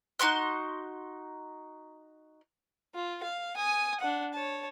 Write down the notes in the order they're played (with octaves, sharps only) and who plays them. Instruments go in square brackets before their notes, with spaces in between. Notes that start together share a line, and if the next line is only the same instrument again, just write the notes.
[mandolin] D#4 F#4 C6 F#6
[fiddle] F4
F5
G#5 D#6
D4 F#5
C#5 A5